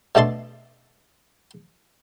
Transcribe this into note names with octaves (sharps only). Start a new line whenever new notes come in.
B2 A3 D4 A5 C6